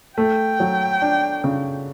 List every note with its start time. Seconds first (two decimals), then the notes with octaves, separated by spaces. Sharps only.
0.17 A3 G5
0.60 F#3
1.02 D4
1.44 C#3